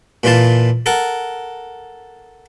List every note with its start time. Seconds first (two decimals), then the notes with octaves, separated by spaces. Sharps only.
0.24 A#2 E3 F4 A5
0.86 A4 A#4 F#5